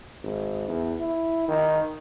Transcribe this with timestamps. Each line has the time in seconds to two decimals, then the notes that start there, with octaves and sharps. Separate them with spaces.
0.23 G#1
0.69 E2
1.00 E4
1.48 D#3